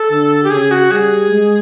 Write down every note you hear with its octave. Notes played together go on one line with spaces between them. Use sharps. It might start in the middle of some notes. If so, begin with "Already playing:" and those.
Already playing: A4
D3
G4
C#3 G#4
F#4
G3 G#4
G#3